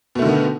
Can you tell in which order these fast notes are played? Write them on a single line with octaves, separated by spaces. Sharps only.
B2 A3 D3 D#3 B3